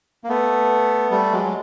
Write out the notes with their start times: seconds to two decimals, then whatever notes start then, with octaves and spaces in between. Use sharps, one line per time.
0.24 A#3
0.29 A3 B3
1.11 G3 A3
1.32 F#3 G#3
1.44 F#3